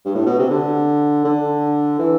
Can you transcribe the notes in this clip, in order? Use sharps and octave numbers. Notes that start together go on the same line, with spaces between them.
G2
A2
B2
C3
D3
D3
E3